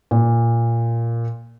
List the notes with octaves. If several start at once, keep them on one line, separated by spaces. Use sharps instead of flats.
A#2